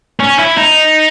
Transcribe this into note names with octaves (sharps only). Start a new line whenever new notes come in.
C#4
E4
D#4